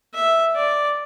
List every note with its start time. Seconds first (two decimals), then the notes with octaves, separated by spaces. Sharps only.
0.15 E5
0.56 D5